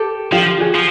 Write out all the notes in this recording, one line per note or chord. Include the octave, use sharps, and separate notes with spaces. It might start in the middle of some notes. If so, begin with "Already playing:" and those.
Already playing: G4 A4
F3 F4 G4
F#4 G#4
F3